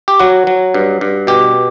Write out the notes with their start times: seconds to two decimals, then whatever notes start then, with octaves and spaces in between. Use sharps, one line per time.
0.08 G4
0.20 F#3 F#4
0.47 F#3
0.74 G2
1.01 G2
1.27 B2 G4